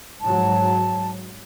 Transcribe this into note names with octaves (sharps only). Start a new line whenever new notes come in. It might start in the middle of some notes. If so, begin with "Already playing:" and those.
G#2 F#3 A5